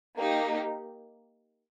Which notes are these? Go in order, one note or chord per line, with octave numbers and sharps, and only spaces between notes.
A#3 D#4 G4